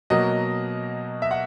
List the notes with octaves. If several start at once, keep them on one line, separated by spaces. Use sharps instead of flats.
B2 F#3 A#3 D#5
E5
F#5